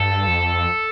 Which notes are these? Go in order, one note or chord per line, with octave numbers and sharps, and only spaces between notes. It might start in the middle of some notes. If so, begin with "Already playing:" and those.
Already playing: G2 A4
F2